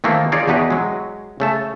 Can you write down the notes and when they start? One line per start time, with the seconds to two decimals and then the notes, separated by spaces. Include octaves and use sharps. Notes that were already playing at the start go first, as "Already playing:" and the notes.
0.04 D#3 E3 A3 A#3 C4 A4
0.32 D#4 F4 G#4 C#5 D5
0.47 E2 B2 D#4 G4 B4
0.70 F#3 G#3
1.40 C#3 A3 A5